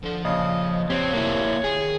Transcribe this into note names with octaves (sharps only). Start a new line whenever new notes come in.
D3 F3 C6
A#1 C#3 D#5
C4 G4 C#5 F5
A#3 E4
D#3 G#4